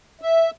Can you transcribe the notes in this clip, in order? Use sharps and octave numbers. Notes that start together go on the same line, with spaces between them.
E5